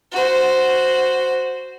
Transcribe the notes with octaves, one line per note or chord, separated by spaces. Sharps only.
F#4 C5